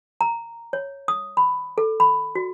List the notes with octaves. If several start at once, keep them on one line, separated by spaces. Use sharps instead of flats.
A#5
C#5
D#6
B5
A4
B5
F#4